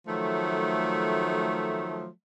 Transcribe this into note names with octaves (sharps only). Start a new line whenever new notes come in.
D#3 F3 F#3 A3